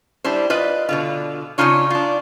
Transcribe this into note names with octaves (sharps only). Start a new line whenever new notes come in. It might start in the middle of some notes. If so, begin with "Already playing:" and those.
G3 D4 E4 C5
F4 B4 D5 D#5
B2 D3 F4
C#3 C4 D4 D#4 F4 C#5
D4 F4